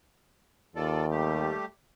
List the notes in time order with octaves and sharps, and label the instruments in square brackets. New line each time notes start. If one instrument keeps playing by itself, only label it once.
[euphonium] D#2 [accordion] F4 A4 D5
[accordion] G3 A3 G4